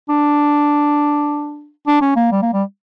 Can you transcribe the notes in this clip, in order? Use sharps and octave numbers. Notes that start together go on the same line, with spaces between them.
D4
D4
C#4
A#3
G3
A#3
G3